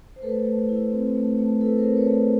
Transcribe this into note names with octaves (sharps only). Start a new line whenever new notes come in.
C5
A3 A4 B4
A3
E4
C4
A3
A3
E4 A4 B4
A#4 C5
C4
B4 C#5
A3